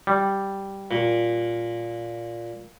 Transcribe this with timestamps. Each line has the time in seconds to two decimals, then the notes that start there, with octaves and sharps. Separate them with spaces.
0.07 G3
0.91 A#2